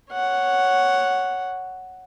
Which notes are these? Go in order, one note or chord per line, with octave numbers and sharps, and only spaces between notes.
C#5 F#5